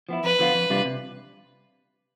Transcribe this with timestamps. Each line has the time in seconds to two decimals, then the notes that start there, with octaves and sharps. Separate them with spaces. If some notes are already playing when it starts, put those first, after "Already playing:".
0.09 F3 B3 E4
0.24 F2 B4
0.39 D3 F3 B3 F4
0.54 F2
0.70 C3 G3 D4 F4
0.85 C3